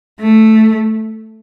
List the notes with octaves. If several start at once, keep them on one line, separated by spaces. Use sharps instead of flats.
A3